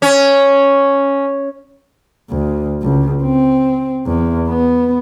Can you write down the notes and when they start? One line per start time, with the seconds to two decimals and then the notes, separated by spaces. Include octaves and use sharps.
0.02 C#4
2.30 D2
2.82 C#2
3.23 C4
4.06 E2
4.49 B3